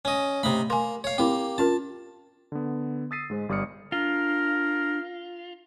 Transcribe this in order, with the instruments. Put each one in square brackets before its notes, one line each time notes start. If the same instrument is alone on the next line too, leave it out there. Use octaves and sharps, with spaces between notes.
[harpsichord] C#4 D#5
[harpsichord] C3 D#4 B5 [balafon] A3
[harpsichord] A#3 [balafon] G#5 C6
[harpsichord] C#5 F5
[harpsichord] A#3 G4 [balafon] C4 E4
[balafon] C#4 F4 A#4 [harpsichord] A5
[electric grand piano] D3 B3
D#6 E6 A6 B6 C7 D#7
G#2 G#3 C5
G1 G3 D5 D#6 F6 C#7
[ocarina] D4 [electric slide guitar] F4 [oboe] A#4